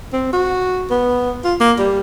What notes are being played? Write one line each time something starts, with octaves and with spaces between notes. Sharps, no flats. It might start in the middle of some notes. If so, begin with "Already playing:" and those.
C4
F#4
B3
F4
A#3
G3